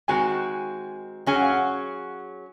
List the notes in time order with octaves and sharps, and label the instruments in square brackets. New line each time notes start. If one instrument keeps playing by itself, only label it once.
[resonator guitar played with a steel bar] D#3 G#3 C4 F#4 [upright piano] G#5
[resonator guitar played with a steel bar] F#3 C#4 G#4 [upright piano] G#5
[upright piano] F#5
F5
F#5